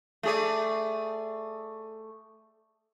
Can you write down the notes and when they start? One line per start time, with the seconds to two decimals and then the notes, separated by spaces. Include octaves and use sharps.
0.23 A3 G#4 D5